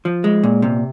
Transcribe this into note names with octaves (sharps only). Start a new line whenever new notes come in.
F3
G#3
A#2
C3